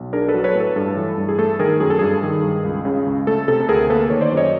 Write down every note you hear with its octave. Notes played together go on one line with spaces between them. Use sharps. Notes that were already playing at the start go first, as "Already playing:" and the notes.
Already playing: B1
D4 G#4 A#4
A4 B4
F#3
B4 C#5
A2 A4
G2 A4
E3
G2
G#4
A3 A4
D#3 G#4 A#4
F#2 G#4
A4
G2 G#4
D#3
G2
C#2
C#3
C#2
A3 A4
C3 A4
A4
D2 G#4 A#4
A#3 A4 B4
D#3 C#5
C5 D5
F#2
C#5 D#5